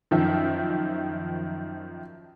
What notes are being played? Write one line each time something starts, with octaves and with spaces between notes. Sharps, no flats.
F#2 D#3 F3 E5